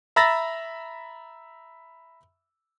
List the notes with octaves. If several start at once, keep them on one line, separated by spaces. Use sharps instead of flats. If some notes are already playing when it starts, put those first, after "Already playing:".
E5 A#5 B5 E6 A6 A#6